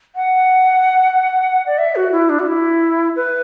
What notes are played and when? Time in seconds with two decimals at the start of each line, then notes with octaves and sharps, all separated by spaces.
0.15 F#5
1.66 D5
1.78 E5
1.96 F#4
2.12 E4
2.29 D4
2.39 F#4
2.46 E4
3.16 B4